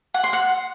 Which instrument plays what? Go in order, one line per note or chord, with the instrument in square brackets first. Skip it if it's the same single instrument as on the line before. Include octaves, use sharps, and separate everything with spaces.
[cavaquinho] F#5
C6
F#5